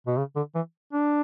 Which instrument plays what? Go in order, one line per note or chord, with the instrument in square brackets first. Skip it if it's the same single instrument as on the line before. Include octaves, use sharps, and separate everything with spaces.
[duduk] B2
C#3
D3
E3
D4